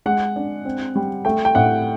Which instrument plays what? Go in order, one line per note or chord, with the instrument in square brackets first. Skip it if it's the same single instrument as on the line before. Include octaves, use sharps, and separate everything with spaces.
[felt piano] G#3 [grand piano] F#5
[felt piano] D4
C4
G3
[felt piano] A3 [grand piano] G5
[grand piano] G5
[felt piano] A2 [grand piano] F#5